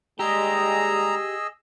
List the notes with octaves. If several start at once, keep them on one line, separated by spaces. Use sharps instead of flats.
D#2 G3 G#3 G4 G#4 D#5 A#5 E6